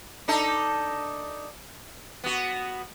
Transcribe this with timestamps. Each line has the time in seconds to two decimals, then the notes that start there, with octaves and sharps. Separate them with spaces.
0.28 D4 D#4 A4
2.24 B3 F#4